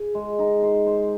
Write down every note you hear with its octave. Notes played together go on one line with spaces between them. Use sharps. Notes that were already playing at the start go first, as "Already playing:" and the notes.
Already playing: G#4
G#3
D#4
C5
C5